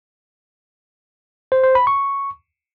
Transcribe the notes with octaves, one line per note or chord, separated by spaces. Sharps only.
C5
C5
B5
C#6